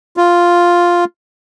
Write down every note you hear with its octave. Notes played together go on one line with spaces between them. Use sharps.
F4